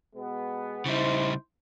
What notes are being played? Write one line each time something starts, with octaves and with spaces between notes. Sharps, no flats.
B2 G#3 B3
C#3 G3 D#4 E4 C5